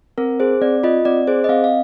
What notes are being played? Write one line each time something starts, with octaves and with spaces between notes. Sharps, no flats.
C4 A#4
G#4 C5
C4 D5
F4 D#5
C4 D5
G#4 C5
D#5
C4 F5
F5